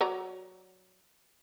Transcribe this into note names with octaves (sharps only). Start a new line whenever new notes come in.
F#3 D5 A#5